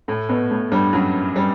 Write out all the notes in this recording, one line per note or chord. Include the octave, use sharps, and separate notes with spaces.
A2 A3
B2 B3
A2 A3
G2 G3
F#2 F#3
G3